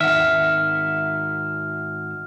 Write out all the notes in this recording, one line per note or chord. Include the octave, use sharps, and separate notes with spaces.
G#1 D#3 E5 F#5 F6